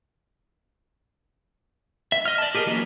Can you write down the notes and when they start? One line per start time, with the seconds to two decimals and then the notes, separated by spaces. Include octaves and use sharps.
2.12 E5
2.26 D#5 F6
2.38 D5 A5
2.55 G4 G#4 A#4 D5 D#5
2.66 E3 F#3 A#3 C#4 D4